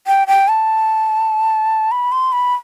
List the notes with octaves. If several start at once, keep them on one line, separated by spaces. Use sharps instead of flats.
G5
G5
A5
B5
C6
B5